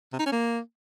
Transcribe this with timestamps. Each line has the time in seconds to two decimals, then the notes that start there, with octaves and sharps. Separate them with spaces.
0.13 C3
0.19 D#4
0.26 C#4
0.32 A#3